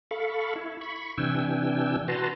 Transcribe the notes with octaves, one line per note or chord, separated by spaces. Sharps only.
A4 F5 B5 C#6
E4
B5 C#6
C3 E3 D4 G5 G#5 E6
F#4 B4 A5 A#5 C6